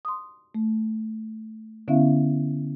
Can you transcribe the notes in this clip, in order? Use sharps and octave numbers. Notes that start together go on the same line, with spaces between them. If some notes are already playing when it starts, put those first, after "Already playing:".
C6 D#6
A3
D3 B3 C#4 E4 E5 F5